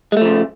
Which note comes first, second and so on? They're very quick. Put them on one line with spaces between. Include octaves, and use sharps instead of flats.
G#3 A3 F3 C#3